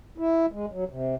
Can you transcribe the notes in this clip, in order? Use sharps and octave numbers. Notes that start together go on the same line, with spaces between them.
E4
G#3
F#3
C3